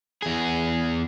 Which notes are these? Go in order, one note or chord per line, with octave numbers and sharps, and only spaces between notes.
E2 G#4